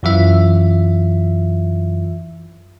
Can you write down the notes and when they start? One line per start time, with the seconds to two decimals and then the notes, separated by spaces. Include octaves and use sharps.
0.03 F#2 E3 F4 E5